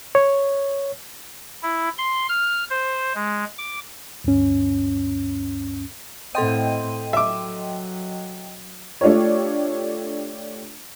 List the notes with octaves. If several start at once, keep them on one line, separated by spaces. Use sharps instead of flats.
C#5
E4
C6
F6
C5
G#3
D6
D2 G2 C#4
A2 C4 A4 D#5 G5 C6 D#7
F#3 E5 D6
A3 D4 F4 G4 C#5